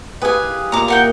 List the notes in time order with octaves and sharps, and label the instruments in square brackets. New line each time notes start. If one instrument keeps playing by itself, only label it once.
[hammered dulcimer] G4 G#4 F5 [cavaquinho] B4 G#5
[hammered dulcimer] A#2 E5 [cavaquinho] A#5 D6
[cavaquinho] A#4 F#5 G5